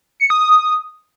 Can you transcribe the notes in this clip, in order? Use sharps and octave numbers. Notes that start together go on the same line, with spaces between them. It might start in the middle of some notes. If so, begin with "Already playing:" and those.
C#7
D#6
D#6